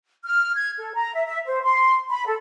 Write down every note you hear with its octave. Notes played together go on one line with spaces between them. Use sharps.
F6
G#6
A4
A#5
E5
E5
C5
C6
B5
A4